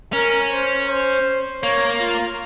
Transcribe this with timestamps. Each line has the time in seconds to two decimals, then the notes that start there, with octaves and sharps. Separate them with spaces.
0.13 C#4 A#4
0.51 C5
0.89 C5
1.63 A#3 C#5
2.00 F4